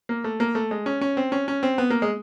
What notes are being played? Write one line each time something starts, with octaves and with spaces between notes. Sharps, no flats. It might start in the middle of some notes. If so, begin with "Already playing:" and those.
A#3
A3
A#3
A3
G#3
C#4
C#4
C4
C#4
C#4
C4
B3
A#3
G#3